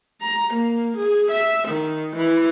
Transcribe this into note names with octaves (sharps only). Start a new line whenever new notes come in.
A#5
A#3
G#4
E5
D#3
E3